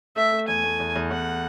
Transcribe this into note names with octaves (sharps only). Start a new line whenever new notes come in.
A3 E5
A3
E2 G#5
A3
E2
E2
E2 F#5